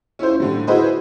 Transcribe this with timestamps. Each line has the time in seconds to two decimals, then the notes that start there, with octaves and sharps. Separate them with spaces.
0.19 C#4 E4 F4 C5
0.40 A2 D3 G3
0.67 E4 F#4 G#4 B4 C5 D#5